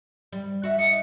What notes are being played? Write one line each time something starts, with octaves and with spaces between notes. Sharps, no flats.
G3
F#4 E5
D#4 C#7